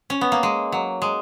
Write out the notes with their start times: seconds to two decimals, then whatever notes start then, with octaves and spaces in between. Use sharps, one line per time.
0.10 C#4
0.21 B3
0.32 A#3
0.43 G#3
0.72 F#3
1.02 G#3